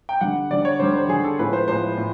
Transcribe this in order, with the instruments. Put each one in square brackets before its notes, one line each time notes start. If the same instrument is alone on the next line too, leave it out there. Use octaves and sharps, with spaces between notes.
[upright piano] G5
D3 G3 F#5
D3 G3 D5
C#5
D3 G3 C5
C5
D3 G3 G#4
A4
A2 F3 G#3 B4
C5
A2 F3 G#3 C5
A2